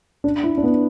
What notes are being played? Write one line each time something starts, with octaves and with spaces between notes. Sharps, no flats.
D4
E4
D4
B3